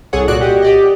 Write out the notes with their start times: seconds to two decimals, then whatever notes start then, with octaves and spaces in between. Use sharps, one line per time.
0.13 C2 G#4 A4 C#5 F#5
0.28 A#2 F#4 D5 F#6 D7
0.41 G4 D#5 F#5
0.62 G4 D5 D#5